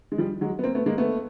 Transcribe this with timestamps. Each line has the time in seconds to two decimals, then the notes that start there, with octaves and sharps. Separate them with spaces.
0.12 G#3
0.18 F3 G3
0.41 F#3 G#3
0.59 B3
0.63 A#3 C4
0.75 A3 B3
0.86 G#3 A#3
0.98 A3 B3